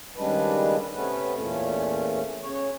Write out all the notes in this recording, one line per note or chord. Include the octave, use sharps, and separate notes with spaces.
D#2 C#3 G3 G#3 D4 B4
C3 A3 B3 C#4 B4
E2 A#2 A3 C#4
C#3 C#5